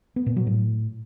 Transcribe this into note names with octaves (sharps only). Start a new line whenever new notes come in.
B3
A#2
F#3
A2